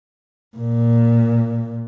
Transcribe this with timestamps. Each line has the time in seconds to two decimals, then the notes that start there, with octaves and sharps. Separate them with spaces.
0.56 A#2